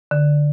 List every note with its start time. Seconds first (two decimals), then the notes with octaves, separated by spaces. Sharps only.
0.11 D3